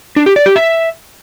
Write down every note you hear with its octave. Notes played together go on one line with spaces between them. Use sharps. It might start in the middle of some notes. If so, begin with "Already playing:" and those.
D4
G4
D5
G4
E5